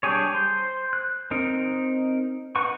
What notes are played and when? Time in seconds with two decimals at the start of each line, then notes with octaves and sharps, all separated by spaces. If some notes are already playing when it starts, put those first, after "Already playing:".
0.03 G3 D4 G4 G#4 C#5
0.34 C5
0.93 F#6
1.31 C4 D#4 A#4
2.56 D#4 B4 F#5 C#6